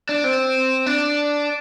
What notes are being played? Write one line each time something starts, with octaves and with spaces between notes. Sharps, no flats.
D4
C4
D4